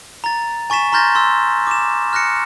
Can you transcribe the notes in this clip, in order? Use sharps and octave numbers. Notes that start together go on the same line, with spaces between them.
A#5 A6
G#5 C#6 A6 B6 E7
A#5 C6 F6 G6 A6 A#6
C6 E6
D6 E7
F6 F#6 A#6 C#7